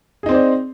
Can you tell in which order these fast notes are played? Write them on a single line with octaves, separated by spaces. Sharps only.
G#4 D#4 C4 C5 D5